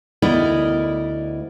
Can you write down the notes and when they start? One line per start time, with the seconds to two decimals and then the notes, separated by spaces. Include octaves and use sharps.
0.22 D2 B3 E4 A#4 D5 D#5